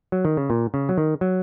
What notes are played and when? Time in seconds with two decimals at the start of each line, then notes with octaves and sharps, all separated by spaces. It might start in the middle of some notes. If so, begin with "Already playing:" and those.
0.12 F#3
0.25 D#3
0.37 C#3
0.50 A#2
0.74 C#3
0.89 F#3
0.98 D#3
1.21 F#3